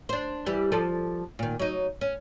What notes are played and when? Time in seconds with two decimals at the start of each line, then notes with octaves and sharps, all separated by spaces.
0.09 D4 C5
0.46 E3 G3
0.72 F3 A4 D5
1.39 A#2 D#3
1.59 F#3 D#4
2.01 C#4